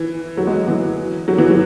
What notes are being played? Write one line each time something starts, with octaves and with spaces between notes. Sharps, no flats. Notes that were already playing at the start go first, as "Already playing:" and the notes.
Already playing: E3
F#3
G#3
E3
F#3
E3
F#3